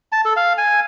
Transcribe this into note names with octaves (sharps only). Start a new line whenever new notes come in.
A5
A4
F5
G#5